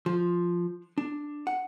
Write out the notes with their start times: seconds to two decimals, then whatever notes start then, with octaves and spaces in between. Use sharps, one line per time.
0.06 F3
0.98 D4
1.47 F#5